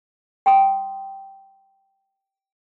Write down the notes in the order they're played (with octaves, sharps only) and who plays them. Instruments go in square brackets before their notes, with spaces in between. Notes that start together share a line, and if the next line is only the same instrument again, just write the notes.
[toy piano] G5 C6 D#6